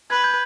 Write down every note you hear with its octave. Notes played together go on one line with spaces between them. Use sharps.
B4 G#6
G6